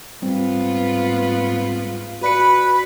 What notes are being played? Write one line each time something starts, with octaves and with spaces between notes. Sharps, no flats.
G#2 G3 B3 C4 F4
F#4 B4 D5 C#7